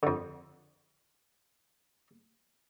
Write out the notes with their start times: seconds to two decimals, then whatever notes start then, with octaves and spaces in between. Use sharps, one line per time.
0.03 F2 D3